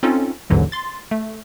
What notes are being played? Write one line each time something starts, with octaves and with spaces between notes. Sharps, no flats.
C4 C#4 D#4 F4 A4
A1 D#2 G#2 D3 E3 F#3
C6 A6
A3